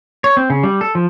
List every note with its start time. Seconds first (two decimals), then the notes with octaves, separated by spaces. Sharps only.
0.24 C#5
0.37 C4
0.50 C#3
0.63 G3
0.81 A4
0.95 F3